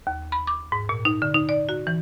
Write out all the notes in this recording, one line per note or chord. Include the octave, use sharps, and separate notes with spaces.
D#2
B5
D6
G#2
A#2
D#4
D3
D#4
D5
F#4
E3